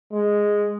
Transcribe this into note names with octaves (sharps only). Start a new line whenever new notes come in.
G#3